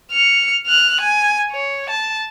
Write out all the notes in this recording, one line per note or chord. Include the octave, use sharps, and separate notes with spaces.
F6 C#7
F6 F#6
G#5
C#5
A5